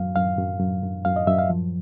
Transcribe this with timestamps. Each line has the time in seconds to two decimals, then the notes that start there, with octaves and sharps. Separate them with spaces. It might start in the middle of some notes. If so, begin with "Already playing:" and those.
Already playing: F#2 F#3 F5
0.16 F#2 F5
0.38 F#2
0.60 F#2
0.83 F#2
1.05 F#2 F5
1.16 D#5
1.27 F#2 E5
1.39 F5
1.50 F3